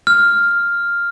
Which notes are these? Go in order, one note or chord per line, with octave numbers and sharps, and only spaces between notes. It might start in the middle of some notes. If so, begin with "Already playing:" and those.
F6